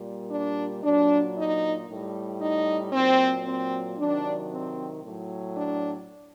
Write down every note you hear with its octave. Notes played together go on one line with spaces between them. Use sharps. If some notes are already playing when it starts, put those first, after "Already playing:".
Already playing: A#2 G3
D4
A#2 F#3 D4
D#4
A2 G3
D#4
A#2 F#3 C4
C4
C3 D#3 F#3 D4
C4
A2 F#3
D4